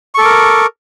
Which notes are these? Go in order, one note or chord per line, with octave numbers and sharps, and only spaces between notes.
A4 A#4 C#6 D6